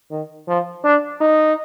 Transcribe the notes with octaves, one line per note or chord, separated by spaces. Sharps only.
D#3
F3
D4
D#4